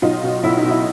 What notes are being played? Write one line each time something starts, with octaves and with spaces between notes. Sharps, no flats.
B1 D#4 F4
B2
B1 E4
D#4
B2
E4